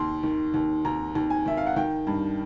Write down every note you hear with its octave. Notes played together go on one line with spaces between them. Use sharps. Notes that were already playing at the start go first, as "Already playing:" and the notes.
Already playing: D#2 C6
D#3
D#2
D#2 A#5
D#2
G#5
D#3 E5
F5
F#5
D#3 G5
G2